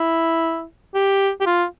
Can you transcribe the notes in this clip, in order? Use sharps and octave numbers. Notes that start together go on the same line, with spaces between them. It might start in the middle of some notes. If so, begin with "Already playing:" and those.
Already playing: E4
G4
G4
F4